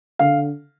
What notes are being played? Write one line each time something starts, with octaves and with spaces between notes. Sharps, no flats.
D3 F5